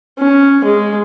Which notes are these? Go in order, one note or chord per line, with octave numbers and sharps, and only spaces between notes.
C#4
G#3